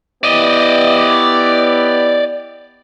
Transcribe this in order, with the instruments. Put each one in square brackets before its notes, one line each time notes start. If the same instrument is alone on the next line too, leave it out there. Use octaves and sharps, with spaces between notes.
[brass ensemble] B3 E4 G4 [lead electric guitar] D5 D#5